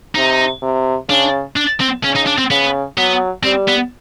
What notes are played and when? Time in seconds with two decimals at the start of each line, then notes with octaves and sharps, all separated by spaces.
0.15 C3 D#4
0.62 C3
1.09 C#3 D4
1.56 D4
1.80 C4
2.04 C#3 C#4
2.15 D#4
2.26 D4
2.38 C4
2.50 C#3 B3
2.97 F#3 B3
3.43 G3 C4
3.68 B3